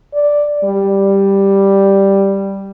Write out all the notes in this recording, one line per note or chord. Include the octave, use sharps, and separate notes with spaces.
D5
G3